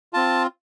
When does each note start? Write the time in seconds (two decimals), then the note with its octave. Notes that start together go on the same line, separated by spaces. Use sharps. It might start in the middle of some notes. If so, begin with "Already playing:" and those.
0.13 C4 F4 A5